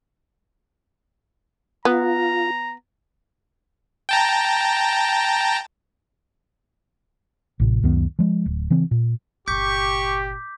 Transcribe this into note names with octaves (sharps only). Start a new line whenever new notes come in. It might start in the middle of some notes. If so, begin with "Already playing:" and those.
B3 F4 A#5
G5 A5 A#5
A1 A2 C3
C#2 F#2 D#3 B3
F3 G#3
D1
C#3 E3 C4
A#2
G1 A#2 G4 C#6 D6 G6 B6